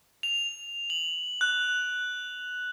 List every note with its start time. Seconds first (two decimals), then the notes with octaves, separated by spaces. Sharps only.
0.23 F7
0.90 F#7
1.41 F#6